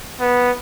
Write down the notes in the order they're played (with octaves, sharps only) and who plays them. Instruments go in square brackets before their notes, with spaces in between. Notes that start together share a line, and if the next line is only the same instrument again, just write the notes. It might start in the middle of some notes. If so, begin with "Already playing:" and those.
[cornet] B3